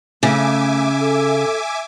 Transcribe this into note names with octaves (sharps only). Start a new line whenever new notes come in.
C#3 A3 E5 G#5 D6
A4